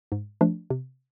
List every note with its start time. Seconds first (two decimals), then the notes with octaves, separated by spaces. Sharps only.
0.12 G#2
0.41 F3 A3 D4
0.70 C3